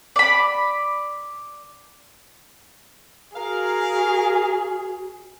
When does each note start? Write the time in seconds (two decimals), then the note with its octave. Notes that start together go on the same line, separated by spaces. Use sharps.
0.16 D5 B5
3.36 F#4 G#4 A#4 F5